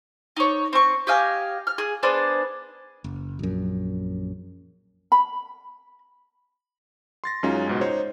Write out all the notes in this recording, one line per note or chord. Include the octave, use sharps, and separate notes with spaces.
D#4 C#5
C4 C#6
G4 D#5 F5 G#5
F6
G#4
B3 D4 G#4 C5
F#1
A#1 F#2
B5
C6 A6 A#6
F#2 G#3 C#4 D#4 F4
C#2 G#2 B2
D#4 C5 C#5